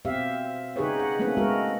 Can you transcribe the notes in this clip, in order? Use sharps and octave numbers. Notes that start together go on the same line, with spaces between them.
B2 C4 G4 E5 F5
C#3 D#4 G4 G#4 B4 C#5
F#5
A3 A#3 C4 C#4 D#4 B4
G#3 B3 F#4 A#4